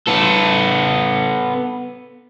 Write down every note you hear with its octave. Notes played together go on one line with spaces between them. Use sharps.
B3 A4